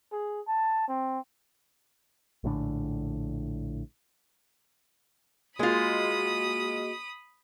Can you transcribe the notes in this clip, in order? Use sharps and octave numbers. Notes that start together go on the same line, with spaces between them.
G#4
A5
C4
A#1 A2 D3
G#3 A#3 F4 F#4 G#4 D#5 B5 D#6